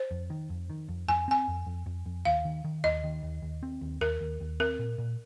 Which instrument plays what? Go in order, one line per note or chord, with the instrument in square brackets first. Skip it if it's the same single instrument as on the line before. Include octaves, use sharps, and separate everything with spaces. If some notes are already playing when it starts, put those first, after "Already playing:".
Already playing: [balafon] C5
[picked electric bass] F2
D#3
F2
D#3
F2
[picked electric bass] F2 [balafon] G#5
[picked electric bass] C4 [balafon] G#5
[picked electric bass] F2
F2
F2
F2
[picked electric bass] D#2 [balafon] F5
[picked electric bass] D#3
D#3
[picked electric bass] D#2 [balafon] D#5
[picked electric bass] D#3
D#2
D#2
C4
D#2
[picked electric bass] D#2 [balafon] A#4
[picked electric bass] D#2
D#2
[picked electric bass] C4 [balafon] A#4
[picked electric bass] A#2
A#2